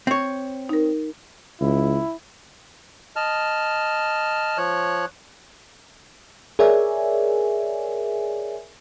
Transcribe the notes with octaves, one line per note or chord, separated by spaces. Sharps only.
C4 C#5
D#4 A#4
C#2 E4
D#5 A5 F6
F3 C#5 F#6
G#4 A#4 C#5 D5 E5 G#5